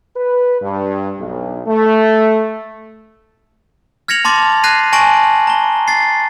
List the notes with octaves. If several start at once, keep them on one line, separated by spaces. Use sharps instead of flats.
B4
G2
B1
A3
F6 G#6 A#6 C#7 F7 F#7
A5 C6 D6 A6
F#6 G#6 A#6 C7 D#7
G#5 A5 C#6 A#6 D7 F#7
A#5 G7
A6 C7